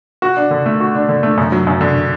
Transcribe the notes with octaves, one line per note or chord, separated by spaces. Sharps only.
F#4
D4
D3
A3
F#4
D4
D3
A3
F#2
F#3
F#2
D3